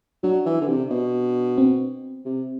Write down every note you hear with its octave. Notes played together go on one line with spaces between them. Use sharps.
F#3 D4
E3
D3
C3
B2
C4
C3